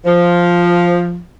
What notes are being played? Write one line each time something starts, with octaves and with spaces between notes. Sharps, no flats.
F3